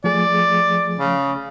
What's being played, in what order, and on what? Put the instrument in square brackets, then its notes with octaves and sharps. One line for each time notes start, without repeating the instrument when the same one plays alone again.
[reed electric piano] F3 A3 G#4 [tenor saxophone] D5
[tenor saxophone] C#3